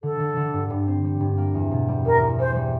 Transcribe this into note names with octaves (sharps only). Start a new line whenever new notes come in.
D3 A4
D3
D3
G2
G2
C4
G3
G2
A#3
E2
B2
G3
E2 A#4
E2
E2 C5
G3